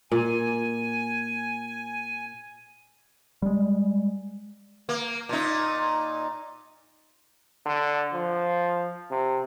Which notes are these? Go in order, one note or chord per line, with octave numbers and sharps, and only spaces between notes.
A#2 G#5
G3 G#3
A#3
A#2 D#4
D3
F3
C3